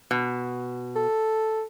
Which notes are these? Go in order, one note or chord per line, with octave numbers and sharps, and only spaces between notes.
B2
A4